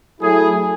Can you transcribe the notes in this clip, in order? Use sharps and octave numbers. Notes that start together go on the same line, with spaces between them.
F#3 A3 E4 G#4